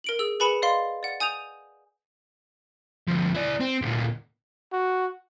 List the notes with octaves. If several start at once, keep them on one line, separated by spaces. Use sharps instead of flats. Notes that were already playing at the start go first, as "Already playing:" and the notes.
A#4 D7 F#7
G#4 E6
G#4 B4 G#5 B5 C#7 E7
D5 D#5 F5 C6
D5 F#5
G#5 D#6 G6 D#7 F7
D2 F3
E4 D5
C4
D2 A#2
F#4